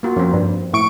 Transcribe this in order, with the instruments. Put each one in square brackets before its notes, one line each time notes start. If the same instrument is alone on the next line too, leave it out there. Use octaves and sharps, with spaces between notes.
[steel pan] A#3 F4 F#4
[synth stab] F#2 [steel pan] F3 C4
[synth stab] G2
A2 C#6 D7